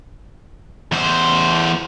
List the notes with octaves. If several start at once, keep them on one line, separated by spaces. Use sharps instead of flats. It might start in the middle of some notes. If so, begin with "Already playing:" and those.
E2 C5